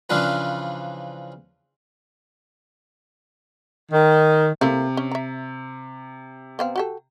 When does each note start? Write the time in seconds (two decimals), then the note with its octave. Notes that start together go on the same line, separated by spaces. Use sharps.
0.10 C#3 E3 F3 D4 F4 B4
3.92 D#3
4.61 C3 A3 A#3 E4
4.97 C#4
5.11 E5 A#5
6.59 B3 C4 F5
6.76 F#4 G4 A4